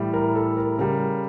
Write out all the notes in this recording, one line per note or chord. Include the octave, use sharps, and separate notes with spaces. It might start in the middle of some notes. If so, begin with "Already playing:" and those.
Already playing: A2 E3 G3
A#4
A4
A#4
C#3 G3 A#4